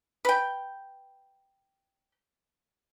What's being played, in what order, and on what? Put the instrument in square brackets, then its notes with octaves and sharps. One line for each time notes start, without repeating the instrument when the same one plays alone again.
[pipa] B4 G5